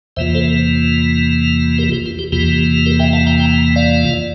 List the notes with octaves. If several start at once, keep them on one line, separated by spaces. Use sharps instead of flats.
E2 C3 E3 A#3 F4 C5 E5
A4 C5
G4 A#4
G4
F4
G4
E2 C3 E3 A#3 F4 G4
G4 A#4
E5 G5
F5 A5
G5 A#5
G5 A#5
D5 F5